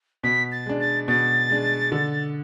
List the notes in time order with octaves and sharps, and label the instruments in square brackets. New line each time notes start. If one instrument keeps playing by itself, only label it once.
[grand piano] B2 [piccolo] B6
[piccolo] A6
[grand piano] G#3 D4
[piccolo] A6
[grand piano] B2 [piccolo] A6
[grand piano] G#3 D4
D3